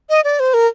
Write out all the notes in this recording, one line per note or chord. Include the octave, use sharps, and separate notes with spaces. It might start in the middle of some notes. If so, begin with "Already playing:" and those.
D#5
D5
C5
A#4